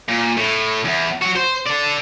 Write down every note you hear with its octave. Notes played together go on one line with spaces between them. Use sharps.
A#2
A2
E2
F#3 F#4
C5
A4 D5